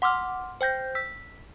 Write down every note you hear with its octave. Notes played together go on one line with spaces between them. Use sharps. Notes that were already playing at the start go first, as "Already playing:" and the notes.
F#5 C6 D6 E6 F6
C5 G5 G6 A#6
E6 B6